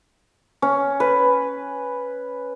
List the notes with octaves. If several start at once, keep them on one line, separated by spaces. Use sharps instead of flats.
C#4
B4